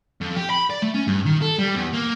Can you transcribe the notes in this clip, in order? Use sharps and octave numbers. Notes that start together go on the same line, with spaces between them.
F2
G4
B5
D5
A3
C#4
G2
D#3
A4
G3
E2
A#3